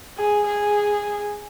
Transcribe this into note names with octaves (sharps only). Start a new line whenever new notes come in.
G#4
G#4